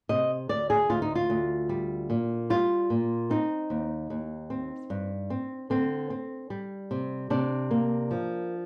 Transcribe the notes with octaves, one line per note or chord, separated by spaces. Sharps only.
C3 D#5
D2 D5
G#4
D2 F4
D#4
F4
D2
G3
A#2
G3 F4
A#2
C4 D#4
D#2
D#2
C4
G2
C4
D3 C4
C4
G3
C3
C3 D4
A#3
F3